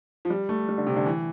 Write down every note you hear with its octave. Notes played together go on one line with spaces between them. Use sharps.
F3
G3
A3
G3
D3
C3
D3
E3